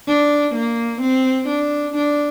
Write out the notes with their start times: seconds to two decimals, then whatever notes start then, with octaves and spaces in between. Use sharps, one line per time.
0.08 D4
0.55 A#3
1.01 C4
1.48 D4
1.96 D4